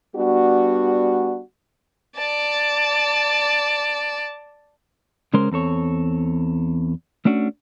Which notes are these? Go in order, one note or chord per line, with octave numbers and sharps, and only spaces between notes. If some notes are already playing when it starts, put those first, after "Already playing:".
G3 B3 D4 F#4
D5 A5
C#3 G#3 C#4 A#4 C5
E2 C4 A4 C#5
A3 C#4 D4 F#4